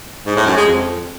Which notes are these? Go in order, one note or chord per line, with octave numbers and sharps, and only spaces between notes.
G#2
A2
F#2
G#3
F2